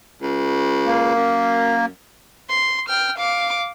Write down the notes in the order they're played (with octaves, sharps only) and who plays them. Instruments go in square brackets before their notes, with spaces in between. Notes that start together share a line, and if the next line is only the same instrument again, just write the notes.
[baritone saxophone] C#2
[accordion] A#3
[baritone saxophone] F#2
[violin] C6
G5 F6
F5 D6